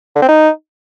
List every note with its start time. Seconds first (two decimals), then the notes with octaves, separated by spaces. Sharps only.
0.16 D3
0.22 C4
0.29 D#4